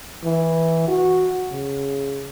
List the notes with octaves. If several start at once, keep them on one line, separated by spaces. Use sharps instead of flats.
E3
F#4
C#3